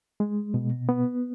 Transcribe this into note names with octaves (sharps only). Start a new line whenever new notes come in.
G#3
B2
B3